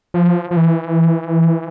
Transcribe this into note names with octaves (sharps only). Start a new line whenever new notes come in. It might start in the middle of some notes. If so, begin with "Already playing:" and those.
F3
F3
E3